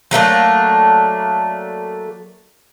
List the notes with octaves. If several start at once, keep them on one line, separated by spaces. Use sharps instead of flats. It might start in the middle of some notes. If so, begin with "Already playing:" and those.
F#3 A3 A#3 D4